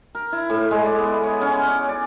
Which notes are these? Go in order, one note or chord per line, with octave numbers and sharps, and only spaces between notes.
A#4
E4
A2
G#3
D5
B3
C#5
C#4
D5
D5